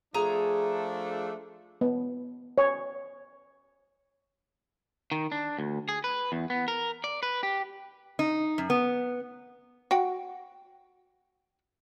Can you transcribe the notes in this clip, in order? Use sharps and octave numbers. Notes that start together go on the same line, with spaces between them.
F3 A3 D4 G#4 A#5
B3
C#5
D#3
D4
D2
G#4
B4
E2
B3
A#4
D5
B4
G4
D#4
F#2
B3
F#4 F#5 G5